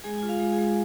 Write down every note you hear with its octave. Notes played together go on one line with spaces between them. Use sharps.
G#3 G#4 G#5
F4 G#5
F4 F5
G#3
G#4 G#5
G#3